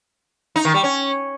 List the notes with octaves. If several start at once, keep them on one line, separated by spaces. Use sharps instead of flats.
D#4
D#3
G3
C#4